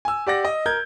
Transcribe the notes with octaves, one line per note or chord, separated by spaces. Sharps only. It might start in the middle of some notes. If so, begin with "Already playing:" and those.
G#5 E6
G4 D5 F#5 A#6
D#5
A#4 G6 G#6